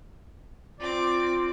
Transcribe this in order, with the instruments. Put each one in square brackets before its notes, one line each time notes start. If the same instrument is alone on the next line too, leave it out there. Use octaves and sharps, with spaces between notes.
[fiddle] C4 D6 [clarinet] F4 [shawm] D5